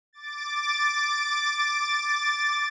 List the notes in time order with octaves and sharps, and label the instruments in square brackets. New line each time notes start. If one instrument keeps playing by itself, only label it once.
[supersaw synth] D6 A6